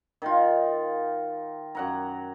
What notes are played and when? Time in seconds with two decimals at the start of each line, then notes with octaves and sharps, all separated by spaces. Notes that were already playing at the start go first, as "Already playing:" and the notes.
0.22 D#3 F4
1.75 F#2 F#5 A#5